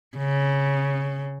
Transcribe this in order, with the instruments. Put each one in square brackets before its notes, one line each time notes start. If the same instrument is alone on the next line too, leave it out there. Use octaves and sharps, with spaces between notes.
[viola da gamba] C#3